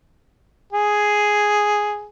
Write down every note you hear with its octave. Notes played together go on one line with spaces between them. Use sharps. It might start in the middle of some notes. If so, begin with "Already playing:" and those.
G#4